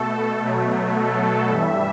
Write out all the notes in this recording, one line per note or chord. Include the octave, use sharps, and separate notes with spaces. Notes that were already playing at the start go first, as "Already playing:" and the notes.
Already playing: B2 A3 A4
B2 F#3 A3
A4
G2 E3 G3 E5